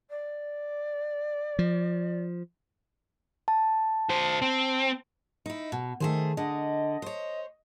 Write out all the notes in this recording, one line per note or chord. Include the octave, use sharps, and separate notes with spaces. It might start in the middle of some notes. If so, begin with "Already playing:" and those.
D5
F3
A5
F#4 C5
C4
D#4 E4
B2
D#3 A3 G#4 C5
D3 D#5
C5 C#5